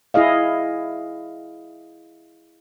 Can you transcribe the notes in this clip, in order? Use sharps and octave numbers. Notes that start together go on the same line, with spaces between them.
E4 G#4 D#5 F5